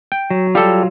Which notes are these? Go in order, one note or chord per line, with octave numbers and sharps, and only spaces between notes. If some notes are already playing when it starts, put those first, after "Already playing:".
G5
F#3
F#3 G3 F4 A4